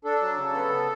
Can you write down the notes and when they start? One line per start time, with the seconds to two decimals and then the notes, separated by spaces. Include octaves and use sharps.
0.05 D4 A4
0.21 F#3
0.38 C#3
0.54 B3